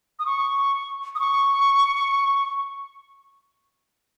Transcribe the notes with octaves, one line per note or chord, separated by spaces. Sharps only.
D#6
C#6
D#6
C#6